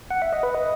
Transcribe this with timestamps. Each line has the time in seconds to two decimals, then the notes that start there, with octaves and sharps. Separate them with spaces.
0.11 F#5
0.22 E5
0.33 D#5
0.43 B4
0.54 D#5